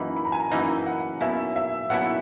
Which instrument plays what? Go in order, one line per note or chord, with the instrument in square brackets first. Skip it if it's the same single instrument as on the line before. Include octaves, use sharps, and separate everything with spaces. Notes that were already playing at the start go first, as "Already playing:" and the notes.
Already playing: [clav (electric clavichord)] F#2 E3 A#3 D#4 [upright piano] B5
[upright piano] B5
A#5
G#5
A#5
[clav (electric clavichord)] F#2 E3 A#3 D#4 [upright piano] G#5
[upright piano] F#5
[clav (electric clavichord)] B1 B2 A#3 C#4 E4 [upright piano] E5
[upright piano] E5
[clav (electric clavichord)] B1 B2 A#3 C#4 E4 [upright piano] F#5